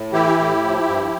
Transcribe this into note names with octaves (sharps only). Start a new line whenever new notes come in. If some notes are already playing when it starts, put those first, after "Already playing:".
Already playing: A2
E3 E4 G4
A2
F3
G2